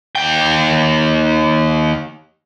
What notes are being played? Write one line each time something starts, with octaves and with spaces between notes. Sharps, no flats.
D#2 G5